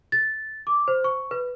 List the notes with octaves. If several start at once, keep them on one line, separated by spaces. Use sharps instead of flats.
A6
D6
C5
C#6
B4